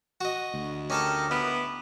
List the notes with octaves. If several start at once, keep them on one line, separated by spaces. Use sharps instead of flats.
F#4 D#5
D2
C#4 G4 A4 A#4 D#5 A5
B3 E4 D6